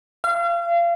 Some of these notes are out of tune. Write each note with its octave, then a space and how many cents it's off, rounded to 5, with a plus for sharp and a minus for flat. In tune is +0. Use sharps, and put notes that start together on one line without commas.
F5 -35